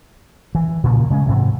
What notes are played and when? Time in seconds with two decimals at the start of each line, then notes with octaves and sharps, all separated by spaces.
0.55 E3
0.84 A#2 C#3 F3 A#3
1.10 C#3 G#3 A#3 C#4
1.26 G#2 C3 E3